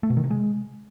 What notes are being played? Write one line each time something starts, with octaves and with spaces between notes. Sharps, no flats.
A3
B2
D#3
C3
G#3